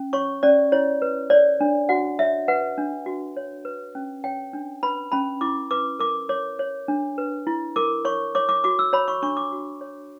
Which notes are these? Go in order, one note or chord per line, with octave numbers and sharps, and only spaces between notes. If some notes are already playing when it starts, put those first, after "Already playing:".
Already playing: C#4
C#5 C#6
C#4 D5
E4 C#5
B4
C#5 D5
D4
F#4 F#5
C#5 E5
B4 F#5
D4
F#4
C#5
B4
C#4
C#5 G5
D4
B4 B5
C#4 B5
E4 D6
B4 D6
A#4 D6
C#5 D6
C#5
D4
B4
E4
A#4 D6
C#5 C#6
C#5 D6
D6
F#4 D6
E6
C#5 B5
C#6
D4 C#6
D6
F#4
C#5